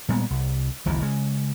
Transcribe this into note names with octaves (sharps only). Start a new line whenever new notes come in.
A#2 G3 G#3 B3
C2
F#1 C#2 D#3 E3
C#3 G#3